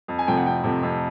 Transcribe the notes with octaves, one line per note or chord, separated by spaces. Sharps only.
F2
G#5
C3 F3 A3 G5
F#5
F2 G5
C3 F3 A3
F2